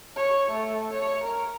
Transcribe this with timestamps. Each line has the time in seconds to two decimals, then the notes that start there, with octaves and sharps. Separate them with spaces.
0.16 C#5
0.50 A3
0.93 C#5
1.23 A#4